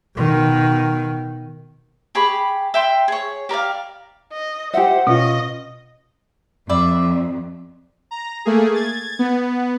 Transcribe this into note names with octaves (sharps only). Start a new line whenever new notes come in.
B2 D#3
G4 G#4 B5 C#6
E5 G5 C6
G#4 C#5
G4 A#4 D5 F5
D#5
G4 C5 E5 F#5
B2 C#4 F4 D#5
F2 D5 E5 B5
A#5
A3 A#3 G#4
G#6 A6
B3